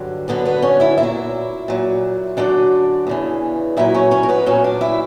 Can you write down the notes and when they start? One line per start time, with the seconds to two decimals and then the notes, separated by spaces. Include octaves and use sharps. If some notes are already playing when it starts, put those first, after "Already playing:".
Already playing: G2 D3 F#3
0.28 F#2 D3 F#3 B3 B4
0.45 B3 B4
0.62 C#4 C#5
0.80 E4 E5
0.98 A#2 E4 E5
1.03 F#3
1.68 A#2 F#3
2.37 F#2 D3 F#3 D4 D5
3.07 E2 C#3 E3
3.77 A#2 F#3 E4 E5
3.94 C#4 C#5
4.11 C#4 C#5
4.23 A#4
4.29 B3 B4
4.46 A#2 F#3 C#4 C#5
4.64 D4 D5
4.81 E4 E5